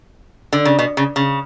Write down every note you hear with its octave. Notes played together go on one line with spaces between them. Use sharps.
D3
C#3
B2
C#3
C#3